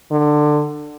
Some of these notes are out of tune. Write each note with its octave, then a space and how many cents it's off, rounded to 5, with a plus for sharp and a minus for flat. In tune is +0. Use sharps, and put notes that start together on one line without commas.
D3 +20